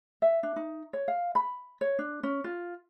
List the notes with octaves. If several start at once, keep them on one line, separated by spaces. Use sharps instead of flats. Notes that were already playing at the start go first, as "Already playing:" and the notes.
E5
D4
D#4
C#5
F5
B5
C#5
D4
C#4
F4